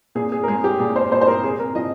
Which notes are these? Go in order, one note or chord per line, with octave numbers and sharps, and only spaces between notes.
A#2 G#4
G#4
A#4
G#3 G#4
G4
A#2 G#4
C5
A#2 C5
C5
A#4
C3 G#4
A#4
F3 D#5